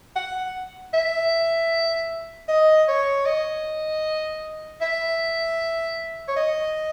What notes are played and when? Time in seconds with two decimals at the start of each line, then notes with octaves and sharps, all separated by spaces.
0.16 F#5
0.94 E5
2.48 D#5
2.88 C#5
3.26 D#5
4.81 E5
6.28 C#5
6.36 D#5